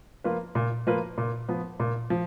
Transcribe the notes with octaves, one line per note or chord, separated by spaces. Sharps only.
F3 A#3 F4 B4
A#2
F3 A#3 F4 B4
A#2
F3 B3
A#2
F3